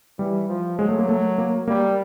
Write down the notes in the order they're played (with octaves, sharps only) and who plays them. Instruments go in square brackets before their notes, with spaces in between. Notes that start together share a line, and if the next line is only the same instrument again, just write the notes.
[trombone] E3 [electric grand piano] G3
[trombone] F3
[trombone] F#3 [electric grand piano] G#3
[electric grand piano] A3
A#3
A3
A#3
[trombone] G3 [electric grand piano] A#3